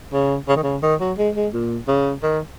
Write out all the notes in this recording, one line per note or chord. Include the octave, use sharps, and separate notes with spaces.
C#3
C#3
D#3
C#3
D#3
F#3
G#3
G#3
A#2
C#3
D#3